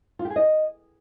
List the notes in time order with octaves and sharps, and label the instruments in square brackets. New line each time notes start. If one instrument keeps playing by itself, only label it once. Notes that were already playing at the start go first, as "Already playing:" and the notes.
[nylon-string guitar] F4
G4
G#4
D#5